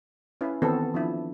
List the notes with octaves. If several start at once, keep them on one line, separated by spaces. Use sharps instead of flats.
C#4 E4 B4
D#3 E3 B3 C4 F#4 A4
F3 D4 E4